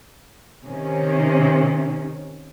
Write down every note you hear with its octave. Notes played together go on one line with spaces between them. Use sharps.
C3 D#3 C#4